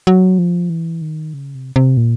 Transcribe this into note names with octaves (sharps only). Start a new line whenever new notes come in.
F#3
F3
E3
D#3
C#3
C3
C3
A#2